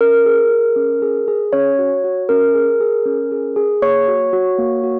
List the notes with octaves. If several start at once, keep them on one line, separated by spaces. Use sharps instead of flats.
C#4 A#4
G#4
G#4
C#4
G#4
G#4
C#4 C#5
F#4
F#4
C#4 A#4
G#4
G#4
C#4
G#4
G#4
A#3 C#5 C#6
F#4
F#4
A#3
F#4